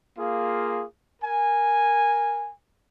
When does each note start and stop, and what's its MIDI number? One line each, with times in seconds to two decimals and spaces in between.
0.18 0.83 58
0.18 0.83 65
0.18 0.83 68
1.23 2.50 70
1.23 2.50 80